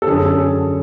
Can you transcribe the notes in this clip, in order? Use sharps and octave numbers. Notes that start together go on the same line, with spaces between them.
A4
F#2 D3 G#4